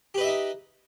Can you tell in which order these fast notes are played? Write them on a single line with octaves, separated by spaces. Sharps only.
G4 B4 D#5 E5 D#4